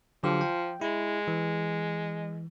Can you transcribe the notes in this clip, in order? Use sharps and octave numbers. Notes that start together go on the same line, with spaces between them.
D3 F3 F#3 G4
G5
G#3 E4
E3